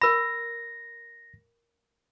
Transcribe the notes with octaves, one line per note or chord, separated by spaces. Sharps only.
A#4 B5 A#6